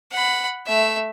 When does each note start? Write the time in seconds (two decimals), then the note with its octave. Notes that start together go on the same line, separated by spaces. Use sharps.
0.11 F#5 B5
0.67 A3 E5